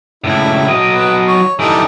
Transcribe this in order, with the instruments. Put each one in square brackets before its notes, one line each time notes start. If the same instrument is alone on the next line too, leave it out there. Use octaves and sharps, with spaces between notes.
[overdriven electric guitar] C#2 A2 [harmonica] E4
[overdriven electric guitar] F#3 D#5
[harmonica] B4
C#5
[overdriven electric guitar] D3 E3 [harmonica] G3 D#4 A4